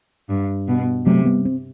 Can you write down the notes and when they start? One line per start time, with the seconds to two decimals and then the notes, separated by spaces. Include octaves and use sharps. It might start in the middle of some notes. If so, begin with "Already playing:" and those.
0.29 G2
0.68 B2
1.06 C3 F#3 A3
1.25 G3 B3
1.45 C4